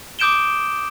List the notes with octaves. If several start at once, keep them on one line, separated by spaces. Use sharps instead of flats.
D6 D#6 G6 D7 E7 G7